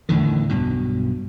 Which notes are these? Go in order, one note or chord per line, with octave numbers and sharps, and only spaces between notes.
E2 A2 D3 D#3
B1 G2 B2